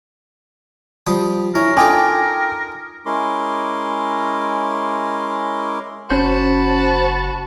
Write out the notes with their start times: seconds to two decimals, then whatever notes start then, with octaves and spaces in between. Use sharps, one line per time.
1.07 F3 G3 D#6
1.55 C#4 E4 A#4
1.77 D#4 F4 A4 G5 G#5 D6
3.06 G#3 C#4 E4 A#4 C6 D6
6.10 F#1 C#4 F#4 C5 A5 B5